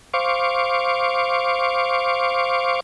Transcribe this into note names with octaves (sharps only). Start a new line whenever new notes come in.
C5 F5 C#6 D6